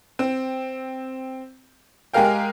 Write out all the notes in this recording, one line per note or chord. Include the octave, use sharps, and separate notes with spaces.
C4
G#3 G4 G#4 A#4 F5 G5